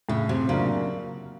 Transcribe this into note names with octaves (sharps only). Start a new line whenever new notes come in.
A2 C#3
C3
C#3 F#3 A#3 D4 F4